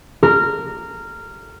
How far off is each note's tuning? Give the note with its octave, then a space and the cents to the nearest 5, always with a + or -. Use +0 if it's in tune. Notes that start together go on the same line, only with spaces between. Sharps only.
A#4 -15